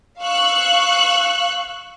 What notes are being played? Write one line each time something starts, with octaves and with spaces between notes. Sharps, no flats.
F5 C#6 E6 F#6